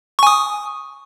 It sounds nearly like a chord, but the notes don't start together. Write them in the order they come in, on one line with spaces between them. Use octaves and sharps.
C#6 G#5 D#6